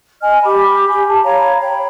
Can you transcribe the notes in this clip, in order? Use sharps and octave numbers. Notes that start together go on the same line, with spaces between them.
D#5 G#5 F6
G4 B5 D6
G4 G#5
A5
C#5 F5 A#5 B5
C#5 G5 B5